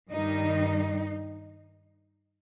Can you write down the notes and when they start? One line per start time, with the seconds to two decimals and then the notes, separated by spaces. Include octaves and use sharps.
0.10 G2 D#3 G3 D#4